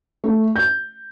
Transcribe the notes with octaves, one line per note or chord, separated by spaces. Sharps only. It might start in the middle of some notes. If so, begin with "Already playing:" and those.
A3
G6